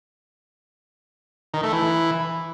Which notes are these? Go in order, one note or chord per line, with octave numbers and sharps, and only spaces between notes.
D#3
A3
E3